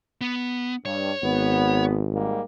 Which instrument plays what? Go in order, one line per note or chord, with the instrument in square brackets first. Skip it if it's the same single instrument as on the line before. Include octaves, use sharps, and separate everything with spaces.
[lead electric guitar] B3
[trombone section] G2 [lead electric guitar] C#5
[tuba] G#1 [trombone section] B3
[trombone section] G#2 G3 A#3